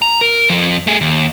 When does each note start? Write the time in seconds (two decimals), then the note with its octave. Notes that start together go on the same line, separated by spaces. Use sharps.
0.02 A#5
0.21 A#4
0.50 F2 F3
0.87 A3 G#4
1.01 D#2